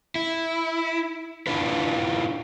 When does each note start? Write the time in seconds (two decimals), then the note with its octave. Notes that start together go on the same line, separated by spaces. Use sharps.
0.16 E4
1.47 D4 E4 F4 B4